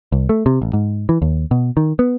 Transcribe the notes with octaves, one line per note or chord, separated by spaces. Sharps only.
C2
A3
C3
A1
G#2
E3
D#2
B2
D#3
B3